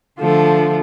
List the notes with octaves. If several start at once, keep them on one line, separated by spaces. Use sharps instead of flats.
D3 F3 A3